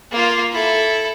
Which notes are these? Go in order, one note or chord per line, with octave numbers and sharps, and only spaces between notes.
A#3 F4
E4 A4